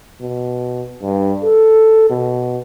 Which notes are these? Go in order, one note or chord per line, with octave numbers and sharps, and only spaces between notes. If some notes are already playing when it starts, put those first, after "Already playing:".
B2
G2
A4
B2